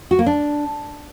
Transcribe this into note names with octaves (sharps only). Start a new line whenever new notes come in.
F#4
A#3
D4